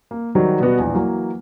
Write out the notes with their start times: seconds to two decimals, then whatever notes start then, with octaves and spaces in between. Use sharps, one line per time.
0.11 A#3
0.35 D#3 F#3 G3 F#4 C5
0.60 B2 G3 B3 F#4
0.78 A#1 E2
0.94 E3 F#3 A#3